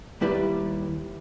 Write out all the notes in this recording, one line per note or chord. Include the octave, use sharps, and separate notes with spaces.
D#2 G3 E4 B4 D5